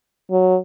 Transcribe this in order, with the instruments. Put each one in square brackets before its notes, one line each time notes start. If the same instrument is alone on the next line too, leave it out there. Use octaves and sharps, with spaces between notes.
[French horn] F#3